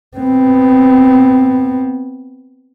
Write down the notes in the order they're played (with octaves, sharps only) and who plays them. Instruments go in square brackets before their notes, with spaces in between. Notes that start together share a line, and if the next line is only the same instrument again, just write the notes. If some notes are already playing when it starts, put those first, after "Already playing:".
[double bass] B3 C4